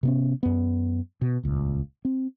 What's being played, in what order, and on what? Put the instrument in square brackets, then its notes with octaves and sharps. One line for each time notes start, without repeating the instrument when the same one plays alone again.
[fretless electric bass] C3 B3 C#4
F#2 B3
B2
D#1 C#2
C4